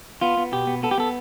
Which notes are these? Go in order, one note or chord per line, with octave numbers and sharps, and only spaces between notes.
B3 F4
B3
B2 G4
B3
B3 A4
G4
B3 A4